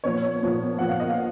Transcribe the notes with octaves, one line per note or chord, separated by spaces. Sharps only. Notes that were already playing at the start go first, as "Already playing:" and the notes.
A#2 F3 B3 C#5
A#2 F3 B3
A#2 F3 B3 F#5
F5
D#5
F5